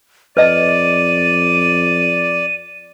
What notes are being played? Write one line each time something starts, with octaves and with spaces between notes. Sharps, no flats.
F2 B4 D5 D#5 D#7